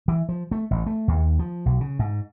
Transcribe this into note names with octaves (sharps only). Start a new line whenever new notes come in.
E3
F3
A3
A1
A3
D#2
F3
B1
C#3
G#2